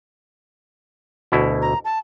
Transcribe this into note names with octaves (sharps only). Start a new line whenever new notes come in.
D2 B2 E4
A#5
A5